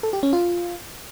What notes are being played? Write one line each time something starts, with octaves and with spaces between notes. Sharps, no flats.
A4
G4
C#4
F4